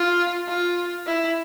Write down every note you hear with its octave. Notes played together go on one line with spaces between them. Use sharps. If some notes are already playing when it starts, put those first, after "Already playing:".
Already playing: F4
F4
E4